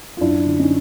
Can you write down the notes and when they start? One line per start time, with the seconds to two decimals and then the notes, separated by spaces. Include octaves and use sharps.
0.17 F4
0.21 F#2 D4 E4
0.46 D3
0.59 C#4 D#4